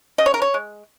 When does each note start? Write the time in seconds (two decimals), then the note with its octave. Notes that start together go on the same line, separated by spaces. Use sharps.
0.18 C#3 D#5
0.26 C#5
0.34 A#4
0.42 C#5
0.54 G#3